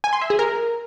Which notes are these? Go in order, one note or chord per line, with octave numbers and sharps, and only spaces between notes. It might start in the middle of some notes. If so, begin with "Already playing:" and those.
G#5
C6
E5
G#4
A#4